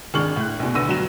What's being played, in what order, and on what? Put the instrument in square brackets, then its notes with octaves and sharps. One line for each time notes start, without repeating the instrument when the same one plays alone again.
[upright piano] G#1 G#3 D4 C#6 F6 F#7
A2 F#6
A#1 B2
B1 D3 B3 E6 A#6 D#7
G2 F#3 G3 E7